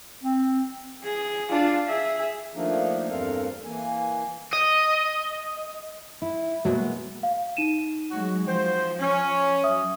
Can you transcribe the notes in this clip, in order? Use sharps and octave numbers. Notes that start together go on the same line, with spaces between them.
C4
G#4
D4 F4
G#4 E5
D#3 F3 A3 A#3 D4 D#4
E2 G2 C4 A4 A#4 F5
E3 A#3 G#5
D#5
E4
B2 F#3 G#3 A#3 B3
F5
D#4 D#7 E7
F#3 G#3 F#4
F3 C4 F#4 C5
C#4
F#3 E5 D#6